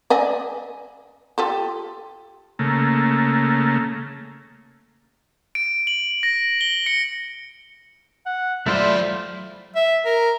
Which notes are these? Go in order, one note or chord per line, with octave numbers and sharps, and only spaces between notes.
D5 D#5 G#5
F4 G4 A4
C#3 A3 A#3
D7
F#7
A#6
G7
C#7
F#5
F#3 A3 E4 F4 C5 D5
E5
A#4